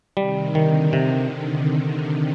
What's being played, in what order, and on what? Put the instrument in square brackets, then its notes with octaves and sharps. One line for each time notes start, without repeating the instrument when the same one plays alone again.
[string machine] C3 D#3 [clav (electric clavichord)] G3
[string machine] D3 [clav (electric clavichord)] D#3
[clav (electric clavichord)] C3